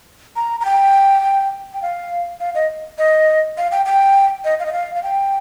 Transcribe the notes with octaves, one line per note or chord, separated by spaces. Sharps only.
A#5
A#5
G5
G5
F5
F5
D#5
D#5
F5
G5
G5
D#5
F5
D#5
F5
F5
G5